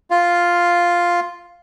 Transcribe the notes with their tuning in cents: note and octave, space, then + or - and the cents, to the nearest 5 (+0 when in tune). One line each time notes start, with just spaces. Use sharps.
F4 +0 F5 +0